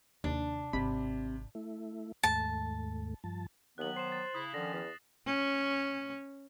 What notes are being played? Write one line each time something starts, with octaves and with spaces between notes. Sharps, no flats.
D#2 C3 D4
G#1 C3 B5
A3 E4
D#2 G#2 A3 A5
G2 F3 A5
D#2 D#3 F#3 B3 F#6 F#7
C5 C7 E7
A6
C#3 E4 D#6
D3 D#3 F3 C#4 A#6
E2 A#6
C#4